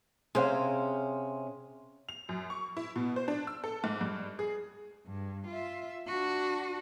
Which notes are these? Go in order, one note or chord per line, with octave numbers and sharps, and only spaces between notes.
C3 C#4 G#4 C5 F5
F7
F#2
C#6
E4
B2
C5
D4
E6
A4
G#2
G2
G#4
G2
F4 E5
D4 F#4